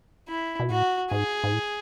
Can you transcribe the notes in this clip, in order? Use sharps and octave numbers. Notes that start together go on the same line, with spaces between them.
E4
B2
A2 F#4
G#2 G#4
G#2
A2